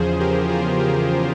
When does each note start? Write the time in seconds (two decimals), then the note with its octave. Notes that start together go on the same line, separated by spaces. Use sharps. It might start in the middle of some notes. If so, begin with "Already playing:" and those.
Already playing: E2 C#3 F3 G#4 C5
0.19 G4 A#4
0.49 F4 G#4
0.79 G4 A#4